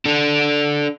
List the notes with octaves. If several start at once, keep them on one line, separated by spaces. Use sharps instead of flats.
D4 A4